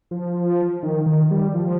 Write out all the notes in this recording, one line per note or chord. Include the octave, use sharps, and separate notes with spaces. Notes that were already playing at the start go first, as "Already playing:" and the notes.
F3
D#3
D#3
G3
F3